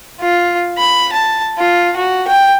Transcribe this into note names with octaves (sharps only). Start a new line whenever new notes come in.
F4
B5
A5
F4
F#4
G5